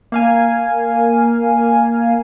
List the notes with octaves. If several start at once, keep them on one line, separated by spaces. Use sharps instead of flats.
A#3 F5 G#5